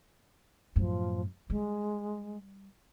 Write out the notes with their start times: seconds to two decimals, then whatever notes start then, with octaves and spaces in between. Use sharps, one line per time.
0.76 F#2 A2 F3
1.50 G3 G#3